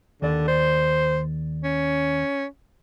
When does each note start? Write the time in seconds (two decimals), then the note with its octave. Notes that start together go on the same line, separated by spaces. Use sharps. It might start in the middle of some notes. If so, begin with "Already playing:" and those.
0.22 D#2 D3 D5
0.48 C5
1.64 C#4